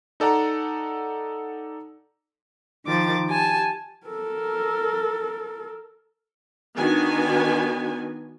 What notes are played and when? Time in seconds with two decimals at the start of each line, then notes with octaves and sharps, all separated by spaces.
0.20 D#4 A4 D5 F#5 A#5
2.85 D#3 F3 D6 A6
3.27 G4 G#5 A5
4.07 A4 A#4
6.77 D#3 B3 D4 F#4 G#5